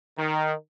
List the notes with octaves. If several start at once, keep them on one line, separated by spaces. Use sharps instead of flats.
D#3